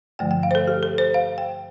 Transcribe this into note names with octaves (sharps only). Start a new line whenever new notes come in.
G2 D3 F3 A3 G5
G5
F5
C5
A4
G4
A4
C5
F5
G5